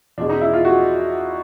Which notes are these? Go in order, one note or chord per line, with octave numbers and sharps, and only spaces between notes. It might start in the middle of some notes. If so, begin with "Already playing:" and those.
E2 B2 G#3 D4
D#4
E4
F4
F#4